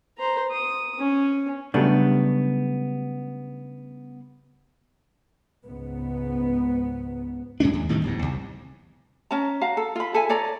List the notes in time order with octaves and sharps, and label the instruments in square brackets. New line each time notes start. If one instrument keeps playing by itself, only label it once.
[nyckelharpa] C5 A#5
D#6
C#4
[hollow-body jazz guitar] C#3 F#3 G3 A3 B3 D4
[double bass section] C#2 G#2 B3
[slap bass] F#2 G#3 C#4 D4
D#2
A2 C3 D#3 G3
D1 E2 G#2
C2
[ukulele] C#4 A5 A#5
F#4 F5 A#5
A4
F4 B5
A4 E5 G#5
A4 C#5 D5 A#5